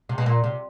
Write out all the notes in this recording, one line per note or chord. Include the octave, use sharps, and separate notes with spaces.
C3
B2
A#2
C3